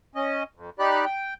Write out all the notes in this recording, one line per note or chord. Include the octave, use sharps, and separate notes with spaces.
C#4 D#5
F2
D#4 G4 D5 B5 F#6
G5